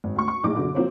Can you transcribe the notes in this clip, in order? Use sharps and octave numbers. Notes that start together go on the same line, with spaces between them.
G#1
D2 C#6
C#6
A#1 A2 D#4 G#4 D6
F#2 B2 D3
F3 A#3 C4 E4 F#4 C#5